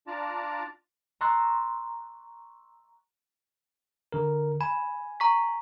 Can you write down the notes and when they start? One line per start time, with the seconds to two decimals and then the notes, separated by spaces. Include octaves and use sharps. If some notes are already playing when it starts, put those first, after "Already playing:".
0.07 D4 F4 D5 A5 A#5
1.21 A#5 C6 C#6 E6 F#6 A6
4.12 D3 A#4
4.61 G#5 B5
5.20 A#5 C#6 B6